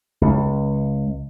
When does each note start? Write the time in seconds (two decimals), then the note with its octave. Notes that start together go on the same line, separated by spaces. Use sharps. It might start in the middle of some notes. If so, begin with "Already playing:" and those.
0.21 C#2